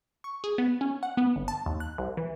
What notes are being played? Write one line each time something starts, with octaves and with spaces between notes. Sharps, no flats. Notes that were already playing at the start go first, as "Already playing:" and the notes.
C#6
G#4
B3
C#4
F#5
B3
G1
A5
D#2
F#6
C2
E3